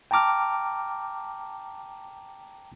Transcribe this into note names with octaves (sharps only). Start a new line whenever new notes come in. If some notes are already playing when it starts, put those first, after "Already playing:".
G5 A5 A#5 D6 F6